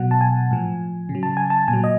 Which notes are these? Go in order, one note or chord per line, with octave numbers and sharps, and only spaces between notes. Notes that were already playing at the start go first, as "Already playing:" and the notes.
Already playing: B2 F#3 F#5
A5
G#5
A2 F3
C#3
F#3
A5
G#5
A5
A#2 G#5
F#3
D#5